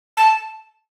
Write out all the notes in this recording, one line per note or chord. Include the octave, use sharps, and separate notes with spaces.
A5